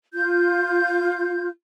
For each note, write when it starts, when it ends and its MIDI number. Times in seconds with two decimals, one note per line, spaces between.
0.13 1.47 65
0.13 1.47 91